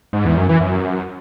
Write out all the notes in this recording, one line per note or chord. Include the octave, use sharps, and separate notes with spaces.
G#2
E2
F#2
E3
F#2